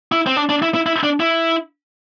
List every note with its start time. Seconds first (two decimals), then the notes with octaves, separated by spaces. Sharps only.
0.12 E4
0.27 C4
0.36 D4
0.49 D4
0.62 E4
0.74 E4
0.86 E4
1.04 D4
1.20 E4